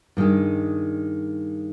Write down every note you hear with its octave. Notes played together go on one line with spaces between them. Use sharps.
G2 D#3 G#3